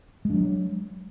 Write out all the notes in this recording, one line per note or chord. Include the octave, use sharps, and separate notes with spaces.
F#3 G#3 D4